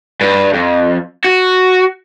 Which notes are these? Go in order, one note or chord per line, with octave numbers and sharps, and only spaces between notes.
G2
F2
F#4